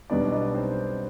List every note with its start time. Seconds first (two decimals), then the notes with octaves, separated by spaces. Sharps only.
0.10 B1 B2 G3 B3 D4 D#4 D5
0.32 D#4 D#5
0.55 C4 C5